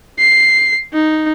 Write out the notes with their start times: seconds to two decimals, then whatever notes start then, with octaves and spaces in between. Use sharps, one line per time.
0.19 C7
0.94 D#4